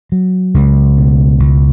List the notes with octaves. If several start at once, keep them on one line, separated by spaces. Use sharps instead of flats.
F#3
C#2
B2
C#2